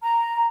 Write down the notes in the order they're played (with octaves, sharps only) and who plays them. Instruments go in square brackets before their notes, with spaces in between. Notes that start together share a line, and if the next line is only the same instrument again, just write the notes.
[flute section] A#5